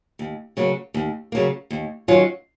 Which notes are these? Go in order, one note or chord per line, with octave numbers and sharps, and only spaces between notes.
D#2
C#3 F#3 A#3
D#2
C#3 F#3 A#3
D#2
D#3 F#3 C#4 F4